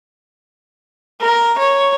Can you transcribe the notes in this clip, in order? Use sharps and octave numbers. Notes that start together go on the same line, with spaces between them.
A#4
C#5